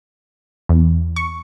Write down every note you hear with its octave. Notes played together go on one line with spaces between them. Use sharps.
E2
C#6